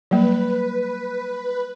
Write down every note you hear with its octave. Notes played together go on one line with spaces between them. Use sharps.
F#3 G3 A#3 B4